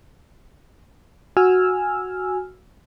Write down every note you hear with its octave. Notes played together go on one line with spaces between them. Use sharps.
F#4 G#5 E6 F6